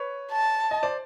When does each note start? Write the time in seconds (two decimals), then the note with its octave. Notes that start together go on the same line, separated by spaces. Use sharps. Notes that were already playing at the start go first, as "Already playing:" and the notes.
Already playing: B4 C#5
0.32 A5
0.71 D#5
0.83 C5 D5